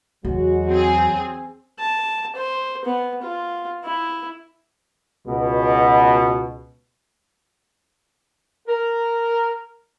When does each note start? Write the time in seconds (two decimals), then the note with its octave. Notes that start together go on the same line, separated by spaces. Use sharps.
0.25 E2 F#3 G#3 F#4
0.67 C4 G#4
1.79 A5
2.36 C5
2.85 B3
3.22 F4
3.85 E4
5.26 C#2 B2
8.68 A#4